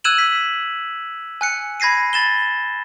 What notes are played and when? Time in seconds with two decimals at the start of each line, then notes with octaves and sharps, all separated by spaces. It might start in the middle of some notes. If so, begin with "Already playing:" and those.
0.04 E6 F#6 G#6 D#7 E7 F#7
0.18 B6
1.41 G#5 F#6 C#7
1.80 B5 G#6 A#6 C7 D#7
2.13 B5 A6 E7 G7